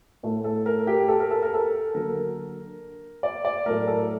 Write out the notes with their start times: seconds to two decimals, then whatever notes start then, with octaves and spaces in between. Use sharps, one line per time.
0.23 A2 A3
0.44 A4
0.66 A#4
0.87 G4
1.08 A4
1.20 A#4
1.31 A4
1.42 A#4
1.54 A4
1.94 D3 F#3 A#3 A#4
3.23 D5
3.45 D5
3.66 A2 F#3 A3 A#4
3.87 A4